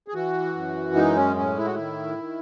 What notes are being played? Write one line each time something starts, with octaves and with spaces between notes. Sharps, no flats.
G#4
E3 F#4
F#2
G#3 D#4
C#4
A2 C#4
E4
F#4
D#3 E4
D#3